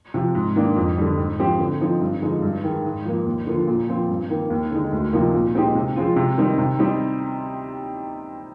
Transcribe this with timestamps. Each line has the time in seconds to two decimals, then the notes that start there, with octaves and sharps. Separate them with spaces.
0.14 C3 F3
0.35 G#2
0.56 D#3 A#3 D4
0.76 F2
0.98 D3 G3
1.18 G#2
1.39 F3 C4 G4
1.60 D3
1.81 F3 C4 D#4
2.02 G2
2.22 D3 F3 G#3 D#4
2.42 G2
2.64 D#3 G#3
2.85 G#2
3.05 F3 A#3
3.26 D#2
3.47 D3 F3 A#3 F4
3.67 A#2
3.89 F3 C4 F4
4.09 G2
4.30 D#3 A#3
4.50 D#2
4.72 D3 G#3 D#4
4.93 D2
5.13 C3 F3 A#3 D#4
5.34 A#2
5.54 G#3 C4 D#4 G4
5.75 C3
5.96 F3 G#3 C4 F4
6.16 C3
6.37 D#3 G3 C4 D#4
6.58 C3
6.79 G3 C4 D#4 G4